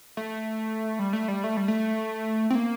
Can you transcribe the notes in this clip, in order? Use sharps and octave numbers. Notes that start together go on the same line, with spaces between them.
A3
G3
A3
G3
A3
G3
A3
C4
A#3